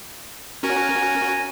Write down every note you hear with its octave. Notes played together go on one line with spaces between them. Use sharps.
C#4 F#4 A#4 G#5 A#5